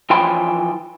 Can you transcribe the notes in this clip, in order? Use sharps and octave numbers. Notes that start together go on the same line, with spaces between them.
E3 F3 G5 B5 C6